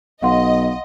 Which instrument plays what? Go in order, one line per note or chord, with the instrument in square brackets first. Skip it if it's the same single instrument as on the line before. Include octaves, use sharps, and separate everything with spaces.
[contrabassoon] B1 [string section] D#5 [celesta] F5 F#5 C6